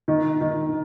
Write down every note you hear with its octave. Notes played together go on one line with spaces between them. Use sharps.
D#3
D#3